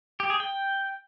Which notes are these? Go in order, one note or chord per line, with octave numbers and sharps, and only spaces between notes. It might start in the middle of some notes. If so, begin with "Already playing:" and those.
G4
G#4
G5